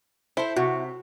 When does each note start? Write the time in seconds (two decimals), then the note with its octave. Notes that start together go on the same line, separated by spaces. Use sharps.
0.37 E4 A4 C5
0.57 C3 F#4